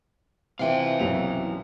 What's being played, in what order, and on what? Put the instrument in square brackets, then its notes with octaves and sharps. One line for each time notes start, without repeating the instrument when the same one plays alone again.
[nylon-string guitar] C3 E3 F4 [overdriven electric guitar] F5 G5
[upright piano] B1 F#2 F7